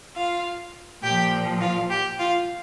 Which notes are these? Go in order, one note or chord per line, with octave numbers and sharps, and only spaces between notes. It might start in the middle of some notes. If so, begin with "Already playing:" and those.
F4 F5
A#2 F3 G4 G5
F4 F5
G4 G5
F4 F5